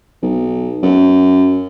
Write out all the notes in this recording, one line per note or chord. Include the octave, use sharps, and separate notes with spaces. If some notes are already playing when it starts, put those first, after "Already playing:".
B1
F#2